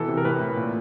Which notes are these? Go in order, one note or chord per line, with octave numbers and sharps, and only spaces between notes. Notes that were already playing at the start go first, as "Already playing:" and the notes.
Already playing: B2 E3 A4
C3
A#4
A2 B4
A2
A#2